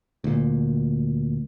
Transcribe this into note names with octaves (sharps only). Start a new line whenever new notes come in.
D2 A#2